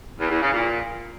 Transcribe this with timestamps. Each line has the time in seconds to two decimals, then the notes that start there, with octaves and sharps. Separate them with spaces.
0.20 E2
0.31 E2
0.42 C#3
0.53 A#2